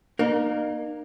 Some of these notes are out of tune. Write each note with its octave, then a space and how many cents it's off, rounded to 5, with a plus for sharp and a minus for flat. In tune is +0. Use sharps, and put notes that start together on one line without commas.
A#3 +20 D#4 -35 A#4 +0